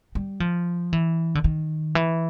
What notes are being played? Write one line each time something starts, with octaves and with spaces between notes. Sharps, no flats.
G3
F3
E3
D3
D#3
E3